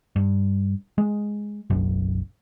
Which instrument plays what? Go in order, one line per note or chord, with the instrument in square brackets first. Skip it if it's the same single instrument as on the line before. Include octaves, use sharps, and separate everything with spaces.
[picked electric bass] G2
G#3
F#1 B1 F#2